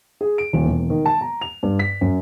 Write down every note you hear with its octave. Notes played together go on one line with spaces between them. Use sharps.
G#4
D7
D#1
E1
D#3
A5
A#5
F7
G2
B6
F#2